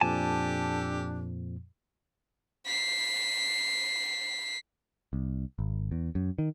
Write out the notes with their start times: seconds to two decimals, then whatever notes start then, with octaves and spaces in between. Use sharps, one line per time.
0.01 F2 A#2 F3 D4 G4 A4 G#5 A5
2.67 B6 C7
5.13 C2
5.59 G#1
5.91 E2
6.15 F#2
6.38 D#3